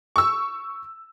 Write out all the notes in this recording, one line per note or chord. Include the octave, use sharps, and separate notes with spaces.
C#6 E6